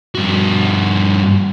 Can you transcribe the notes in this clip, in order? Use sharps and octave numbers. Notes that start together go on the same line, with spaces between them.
G2 F#4